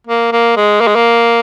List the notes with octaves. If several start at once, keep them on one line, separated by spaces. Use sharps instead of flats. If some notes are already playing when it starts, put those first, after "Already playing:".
A#3
A#3
G#3
A#3
G#3
A#3